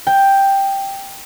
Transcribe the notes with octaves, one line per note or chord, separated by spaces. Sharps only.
G5